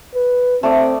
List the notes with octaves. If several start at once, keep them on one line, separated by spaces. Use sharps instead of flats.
B4
A3 C4 D5 D#6